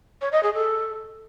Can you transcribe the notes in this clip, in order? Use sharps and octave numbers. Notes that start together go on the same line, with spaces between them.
C#5
D#5
G#4
A4